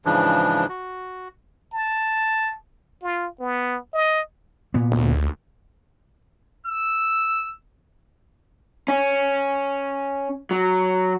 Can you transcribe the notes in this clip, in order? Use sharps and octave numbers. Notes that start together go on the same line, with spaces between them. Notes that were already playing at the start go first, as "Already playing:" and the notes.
G#2 C#3 E3 F3 D4
F#4
A5
F4
B3
D#5
A#2 B3
D2
E6
C#4
F#3